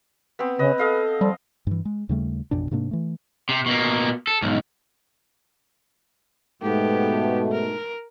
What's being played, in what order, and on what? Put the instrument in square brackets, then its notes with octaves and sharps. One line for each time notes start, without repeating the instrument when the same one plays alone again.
[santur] B3 C4
[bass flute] C#3 [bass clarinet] B4 [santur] D#5
[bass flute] A4 [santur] D#5 F5
[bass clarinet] F3 [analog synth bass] G3
[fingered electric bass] G2 E3
G#3
D#2 C#3 G3 A3
A1 F2 B2 D4
G#2 C3 A#3 D4
E3 A3
[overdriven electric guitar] C3
B2 A#3
A4
B1 G#2
[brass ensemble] G#2 B2 A3 [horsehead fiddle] B3 G4
[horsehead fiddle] A#4